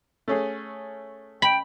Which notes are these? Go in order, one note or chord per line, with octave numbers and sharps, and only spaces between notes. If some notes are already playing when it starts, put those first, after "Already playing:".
A3 C#4 G#4
G5 B5